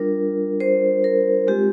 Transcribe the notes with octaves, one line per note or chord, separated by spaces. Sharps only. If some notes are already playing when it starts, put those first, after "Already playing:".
Already playing: G3 D4 F4 A#4
C5
A#4
G#3 C4 F4 G4